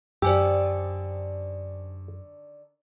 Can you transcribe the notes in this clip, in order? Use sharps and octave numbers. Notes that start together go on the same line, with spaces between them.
F#2 D3 D#3 D4 G4 C5 G#5 E6